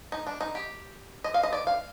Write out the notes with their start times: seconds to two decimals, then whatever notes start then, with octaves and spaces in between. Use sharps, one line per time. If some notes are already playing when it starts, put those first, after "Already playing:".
0.12 D#4
0.27 D4
0.41 D#4
0.55 G4
1.24 D#5
1.34 F5
1.43 D#5
1.53 D5
1.67 F5